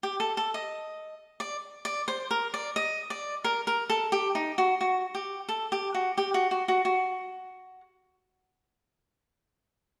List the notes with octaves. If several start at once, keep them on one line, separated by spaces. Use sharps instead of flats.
G4
A4
A4
D#5
D5
D5
C5
A#4
D5
D#5
D5
A#4
A#4
A4
G4
D#4
F#4
F#4
G4
A4
G4
F#4
G4
F#4
F#4
F#4
F#4